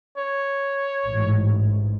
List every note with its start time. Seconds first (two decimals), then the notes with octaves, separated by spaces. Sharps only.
0.17 C#5
1.06 A1 G#2